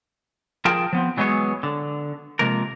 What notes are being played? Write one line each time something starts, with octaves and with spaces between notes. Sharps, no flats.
F3 F4 G#4 A#4 G5 A5
F3 B3 C4
E3 F#3 G#3 B3 G#4 C#5
D3
C3 F3 G#3 A#3 A#4